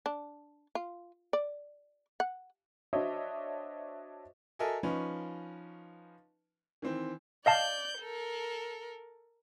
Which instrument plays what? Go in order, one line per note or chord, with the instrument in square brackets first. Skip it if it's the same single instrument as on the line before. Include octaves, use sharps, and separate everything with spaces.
[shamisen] D4
F4
D5
F#5
[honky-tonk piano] D4 F#4 C5 C#5 D#5 E5
[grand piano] F#4 A4 A#4 D#5 E5 G#5
F3 C#4 D#4 B4
D#3 E3 C4
[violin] D5 G6 [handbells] D#5 F5 A5
[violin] A4 A#4